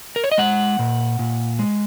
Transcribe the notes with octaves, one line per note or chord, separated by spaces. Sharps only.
A#4
C#5
D#5
G#3 F#5
A#2
A#2
G#3